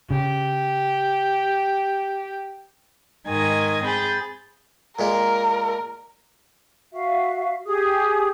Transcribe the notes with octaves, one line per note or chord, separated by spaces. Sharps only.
C#3 G4
G#2 D#3 D#5 G#5 D#6 G#6
C4 G#4 B5 G6 A6
A#2 G#3 A#3 A#4
F#4 E5 F5
G4 G#4 D#6